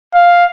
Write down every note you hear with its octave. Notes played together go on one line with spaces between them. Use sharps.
F5